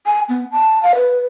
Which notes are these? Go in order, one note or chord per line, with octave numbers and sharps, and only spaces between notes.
G#5
B3
A5
F5
B4